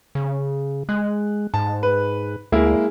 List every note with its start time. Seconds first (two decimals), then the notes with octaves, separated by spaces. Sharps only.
0.15 C#3
0.89 G#3 F#6
1.54 G#2 A5
1.83 B4
2.52 D2 G#3 A#3 E4